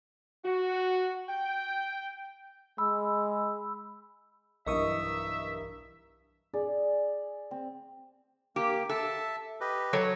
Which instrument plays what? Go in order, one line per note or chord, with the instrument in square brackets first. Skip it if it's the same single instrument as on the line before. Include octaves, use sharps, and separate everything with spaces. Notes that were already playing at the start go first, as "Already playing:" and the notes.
[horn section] F#4
G5
[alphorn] G#3 [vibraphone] B5 E6
[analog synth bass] B1 [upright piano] G2 E3 A#4 [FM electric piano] D#5 C#6 D#6 [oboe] E5
[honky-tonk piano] G#4 [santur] D5
[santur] C4
[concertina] A#3 [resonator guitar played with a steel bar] G4
[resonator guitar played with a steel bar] A4 [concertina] E5 A5
[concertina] G4 B4 D#5
[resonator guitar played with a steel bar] F#3 A4 C#5